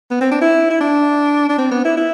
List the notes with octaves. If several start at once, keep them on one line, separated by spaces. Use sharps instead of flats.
B3
C4
D4
E4
E4
D4
D4
C4
B3
E4
E4